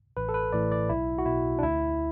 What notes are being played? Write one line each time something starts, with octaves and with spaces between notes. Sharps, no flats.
A1 B4
A4
B4
A2 E3 D5
D5
B1 E4
F#4
B2 E4
D4
D2 E4